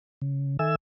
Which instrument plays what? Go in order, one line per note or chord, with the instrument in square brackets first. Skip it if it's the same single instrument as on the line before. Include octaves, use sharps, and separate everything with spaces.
[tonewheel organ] C#3
D#3 A4 E5 G#5 E6